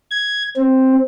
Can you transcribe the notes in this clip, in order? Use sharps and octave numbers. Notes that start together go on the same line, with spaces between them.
G#6
C4